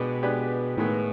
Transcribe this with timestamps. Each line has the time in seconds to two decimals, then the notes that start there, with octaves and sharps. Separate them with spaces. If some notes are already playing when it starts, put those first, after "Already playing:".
Already playing: B2 G#3 B3 D4 G4 B4
0.23 G#3 B3 D4 G4 B4
0.77 A2 D#3 G#3 B3